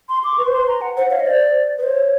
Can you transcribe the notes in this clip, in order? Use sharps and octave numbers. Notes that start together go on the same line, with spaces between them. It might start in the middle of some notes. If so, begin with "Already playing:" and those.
C6
D6
C6
B4 C#6
C5
B4 C6
A#5
F#5
C5 F#5
C#5 F5
D#5
C5 D5
B4
C5 C#5